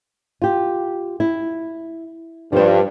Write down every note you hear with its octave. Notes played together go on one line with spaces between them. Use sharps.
F4 G4
E4
G2 F3 C5